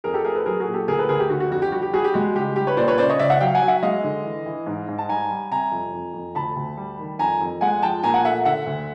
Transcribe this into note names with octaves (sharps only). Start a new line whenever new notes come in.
F2 G#4 A#4
G4 A4
A3 G#4 A#4
A4 B4
F#3 G#4 A#4
F#4 G#4
A#2
G4 A4
D2 G#4 A#4
A4 B4
D2 G#4 A#4
G4
D3 F#4
F#4
F2 F#4
G4
G3 F#4
G4
G3 F#4 G#4
G4
G#3 F#4
C#2 G4
G3 G4
B4 C#5
A#2 C5 D5
B4 C#5
C#3 C5 D5
C#5 D#5
C#2 D5 E5
E5 F#5
F#3 F5 G5
F#5 G#5
F#3
E5 F#5
G#3 D#5 F5
D3
E3
E3
G#2
G#2
A5
G3 G#5 A#5
G3
C3 G#5 A#5
F2
F2
F2
D2 A5 B5
D2
G3
D#3
F2 G#5 A#5
F2
G#3 F#5 G#5
F3 G5 A5
A#2 G#5 A#5
F#5 G#5
A3 E5 F#5
D3 E5 F#5
D2